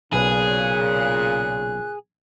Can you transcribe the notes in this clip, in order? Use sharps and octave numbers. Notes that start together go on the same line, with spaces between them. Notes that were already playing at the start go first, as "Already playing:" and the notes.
B1 A#2 C#3 G#4 B4 F#6